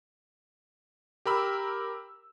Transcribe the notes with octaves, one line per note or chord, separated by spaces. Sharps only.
G4 A#4 B5 E6